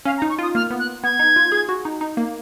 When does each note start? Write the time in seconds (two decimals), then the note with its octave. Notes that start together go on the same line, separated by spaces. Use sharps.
0.05 C#4 F5
0.18 A#5
0.22 D#4
0.29 C#6
0.39 F4 D#6
0.55 A#3 F6
0.70 B3
0.79 F#6
1.04 B3 G#6
1.19 D#4
1.36 F4
1.52 G#4
1.69 F#4
1.85 D#4
2.01 D#4
2.17 A#3